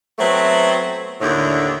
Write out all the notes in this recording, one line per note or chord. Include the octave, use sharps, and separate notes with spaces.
F#3 A3 B3 C4
D#2 A2 D3